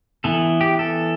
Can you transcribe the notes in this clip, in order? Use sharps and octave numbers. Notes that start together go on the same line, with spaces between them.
E3 B3 A4
G4
A4